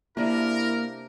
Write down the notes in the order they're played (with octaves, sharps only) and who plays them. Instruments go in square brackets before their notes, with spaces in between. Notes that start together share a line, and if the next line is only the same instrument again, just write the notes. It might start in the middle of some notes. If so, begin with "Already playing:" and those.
[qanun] C3 D4 B4 [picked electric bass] A#3 [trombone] E4 [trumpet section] A#4